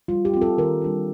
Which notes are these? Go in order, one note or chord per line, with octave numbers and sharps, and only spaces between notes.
G3 F4
G4
C4 F4
A4
D#3 A#4
G3 D4 F4